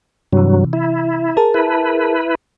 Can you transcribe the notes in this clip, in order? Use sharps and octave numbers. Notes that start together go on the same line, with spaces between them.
G2 C3 E3 F#3
E4
G#4 A#4 A5
E4 B4